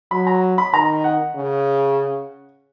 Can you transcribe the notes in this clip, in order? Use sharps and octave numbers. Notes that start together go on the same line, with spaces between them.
F#3 B5
A#5
B5
D#3 A#5
F#5
C#3